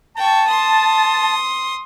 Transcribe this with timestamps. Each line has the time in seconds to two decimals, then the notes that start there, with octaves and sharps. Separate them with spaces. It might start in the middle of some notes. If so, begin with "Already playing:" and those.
0.17 G5 A5 C#6
0.48 C6 D#6